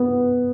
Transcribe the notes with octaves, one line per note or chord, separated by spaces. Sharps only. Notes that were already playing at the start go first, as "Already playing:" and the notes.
Already playing: B3